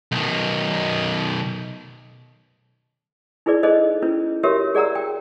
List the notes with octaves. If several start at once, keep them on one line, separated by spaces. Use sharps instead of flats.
B1 D#3
D#4 E4 G#4 B4 D5
D#4 G#4 A4 B4 C5 D#5
C#4 E4 B4
F#4 G4 A#4 B4 C#5 E5
G#4 D5 F#5 A#5 E6
G5